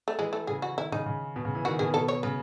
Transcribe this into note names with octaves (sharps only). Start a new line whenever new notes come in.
A3
E3 G#3
A3
C#3 G#4
F#4
D#3 E4
C#3 D#4
C#3
B2
C#3
E3
D#3 F#4
B2 G#4
B2 A4
C#5
C#3 B4